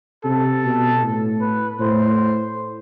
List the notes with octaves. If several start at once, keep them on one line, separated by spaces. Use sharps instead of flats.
C3 A4
B2
A2
B4
A2 C5